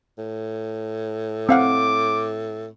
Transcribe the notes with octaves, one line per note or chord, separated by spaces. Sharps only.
A2
C4 F5 F#5 D6